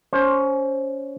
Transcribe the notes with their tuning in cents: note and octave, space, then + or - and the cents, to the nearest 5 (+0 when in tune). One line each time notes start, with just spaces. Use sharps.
C#4 +25 C5 +25